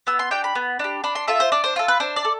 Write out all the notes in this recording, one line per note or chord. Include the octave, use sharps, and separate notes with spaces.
B3 E6
C6
D4 G4 G5
B5
B3
D4 G4
D4 B5
C6
F4 A4 E5
C5
D4 D5
C5
F4 A4
B4
D4 C5
D5
A4